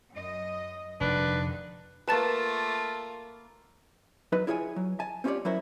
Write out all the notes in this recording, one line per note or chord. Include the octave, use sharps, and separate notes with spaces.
F#2 D#5
F1 G2 D3 D#3 D4 B4
A3 A#3 F4 B4 A5 B5 A6
F#3 D#4 B4
E4 F4 G#4 C#5 F5 G#5
F#3
G#5 A5
C4 C#4 F4 G4 C#5 D5
F#3 C#4 E4 A#4 C5 C#5